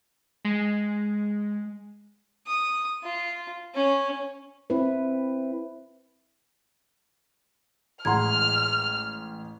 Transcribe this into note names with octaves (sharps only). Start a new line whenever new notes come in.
G#3
D#6
F4
C#4
C4 E4 B4
A1 G#3 F#5 A#5 C6 F6 G#6